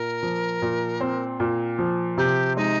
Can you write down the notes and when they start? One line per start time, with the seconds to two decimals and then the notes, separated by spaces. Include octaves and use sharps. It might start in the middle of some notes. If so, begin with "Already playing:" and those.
Already playing: A#2 A#4
0.23 F3
0.62 A#2
1.01 C4
1.40 A#2
1.79 F3
2.18 C3 G4
2.57 G#3 D#4